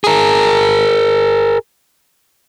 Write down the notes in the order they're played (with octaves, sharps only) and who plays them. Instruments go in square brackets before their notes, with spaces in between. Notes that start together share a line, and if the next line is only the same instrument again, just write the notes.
[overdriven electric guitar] G#4 A#4